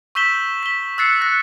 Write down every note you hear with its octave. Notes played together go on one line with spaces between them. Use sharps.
C#6 E6 G6 B6 E7 G7
B6 G7
E6 F#6 A6 C7 C#7
F#6 A#6